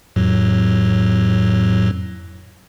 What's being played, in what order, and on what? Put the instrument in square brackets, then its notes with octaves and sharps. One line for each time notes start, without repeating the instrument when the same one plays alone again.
[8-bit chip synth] F2 A2 F#3